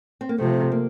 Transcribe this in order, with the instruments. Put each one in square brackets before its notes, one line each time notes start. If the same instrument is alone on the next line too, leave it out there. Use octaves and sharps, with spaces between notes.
[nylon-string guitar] C4
A#3
[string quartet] C3 F3 C4 [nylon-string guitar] A3
[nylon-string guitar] A#3